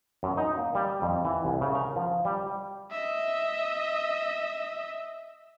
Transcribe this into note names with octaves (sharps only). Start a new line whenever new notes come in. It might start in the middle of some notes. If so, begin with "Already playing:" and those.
F#2
D#4
A#3
G3
F2
E3
C2
C#3
A#4
F3
G3
D#5 E5